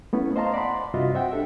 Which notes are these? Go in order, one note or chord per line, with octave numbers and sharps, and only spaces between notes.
A3 B3 C#4 E4
C5 D#5 F5 A5 A#5 C6
D5 F#5 B5 C6
G2 C3 F4 F#4 D#5 E5
C5 E5 F#5 G5
D4 G4 A4 E5